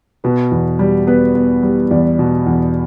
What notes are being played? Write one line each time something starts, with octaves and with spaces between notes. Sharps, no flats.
B2 B4
E2
G3
B3 B4
B3
G3
E2 D5
B2
E2